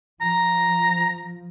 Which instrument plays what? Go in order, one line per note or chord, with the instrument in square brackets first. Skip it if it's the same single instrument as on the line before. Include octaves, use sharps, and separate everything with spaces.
[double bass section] F3 [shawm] A#5